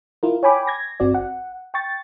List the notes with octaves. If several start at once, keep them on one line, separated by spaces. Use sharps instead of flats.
E4 F4 A#4
C#5 G5 G#5 B5 D6
G#6 A#6
G1 C4 F#4 D5
F#5
G5 C#6 A6